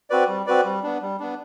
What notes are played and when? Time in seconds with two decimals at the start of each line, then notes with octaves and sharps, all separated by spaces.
0.10 C4 F#4 B4 D5
0.28 G3
0.46 C4 F#4 B4 D5
0.65 G3
0.83 B3 D4
1.02 G3
1.20 B3 D4